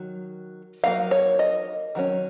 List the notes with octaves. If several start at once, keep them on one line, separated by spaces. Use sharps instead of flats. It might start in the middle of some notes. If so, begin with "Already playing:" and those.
Already playing: D#3 F#3
F#3 A#3 D#4 F5
C#5
D#5
D#3 F#3 C#4